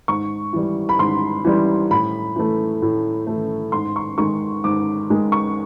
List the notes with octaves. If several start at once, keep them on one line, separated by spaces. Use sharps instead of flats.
G#2 C#6
E3 G3
B5
G#2 C6
E3 G3
A2 B5
E3 A3
A2
E3 A3
G#2 C6
C#6
D#3 G#3 C#6
G#2 D6
D#3 G#3
C#6